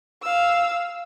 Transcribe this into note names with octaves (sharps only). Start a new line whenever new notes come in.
F5 E6